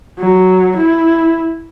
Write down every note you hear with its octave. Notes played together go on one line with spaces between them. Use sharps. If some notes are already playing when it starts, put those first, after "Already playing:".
F#3
E4